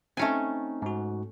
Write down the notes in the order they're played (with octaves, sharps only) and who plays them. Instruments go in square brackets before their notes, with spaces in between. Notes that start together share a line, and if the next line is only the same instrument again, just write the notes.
[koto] A3 C#4 G#5 [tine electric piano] C4 D#4
[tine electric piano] G#2 F#4